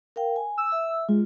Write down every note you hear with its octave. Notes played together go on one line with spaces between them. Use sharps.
A#4 F5 G5
G#5
E6
E5
G#3 F4